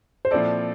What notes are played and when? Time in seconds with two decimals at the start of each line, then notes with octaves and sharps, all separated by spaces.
0.25 C5
0.31 A#2 F3 C4 E4 A4 D5